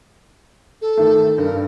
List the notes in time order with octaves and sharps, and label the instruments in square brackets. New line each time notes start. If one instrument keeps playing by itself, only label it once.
[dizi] A4
[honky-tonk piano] D#3 A3
[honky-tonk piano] G2 [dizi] A#4